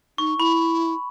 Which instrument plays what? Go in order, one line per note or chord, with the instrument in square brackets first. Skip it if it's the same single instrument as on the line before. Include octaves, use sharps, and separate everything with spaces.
[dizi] D#4 [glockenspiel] C#6
[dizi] E4 [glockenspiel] B5